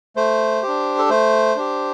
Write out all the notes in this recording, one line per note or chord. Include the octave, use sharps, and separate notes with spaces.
A3 C5
G4
D4
A4
A3 C5
D4 G4